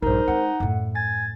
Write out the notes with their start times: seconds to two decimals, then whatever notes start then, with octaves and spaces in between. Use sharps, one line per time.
0.02 A#1 G2 D#4 A#4 C5
0.28 G#3 C4 F#5
0.60 F#2 A2
0.95 G#5 A6